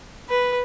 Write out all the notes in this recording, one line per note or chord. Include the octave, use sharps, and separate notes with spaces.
B4